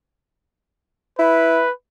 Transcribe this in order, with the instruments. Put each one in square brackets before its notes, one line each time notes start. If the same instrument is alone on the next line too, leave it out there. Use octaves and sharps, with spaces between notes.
[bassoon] E4 [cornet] B4